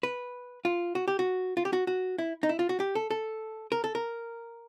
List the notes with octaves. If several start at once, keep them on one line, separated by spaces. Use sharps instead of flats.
B4
F4
F#4
G4
F#4
F4
G4
F#4
F#4
E4
D#4
E4
F4
F#4
G4
A4
A4
A#4
A4
A#4